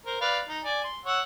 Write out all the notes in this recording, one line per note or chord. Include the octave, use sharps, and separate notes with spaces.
A#4 C5
B4 D5 F5
D#4
D5 G#5
C6
C#5 F#5 E6